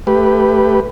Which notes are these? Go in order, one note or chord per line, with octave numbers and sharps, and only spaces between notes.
A3 G4 B4